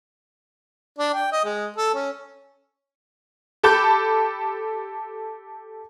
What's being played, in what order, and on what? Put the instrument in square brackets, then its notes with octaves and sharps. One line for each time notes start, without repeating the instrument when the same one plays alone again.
[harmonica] D4
G5
D#5
G#3
A4
C#4
[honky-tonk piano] G4 A4 A5 B5 D6 G6